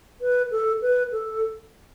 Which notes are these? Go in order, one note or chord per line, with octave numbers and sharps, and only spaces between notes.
B4
A4
B4
A4